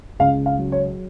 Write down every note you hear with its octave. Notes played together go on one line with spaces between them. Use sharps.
C#2 F5
F5
F#3
C#5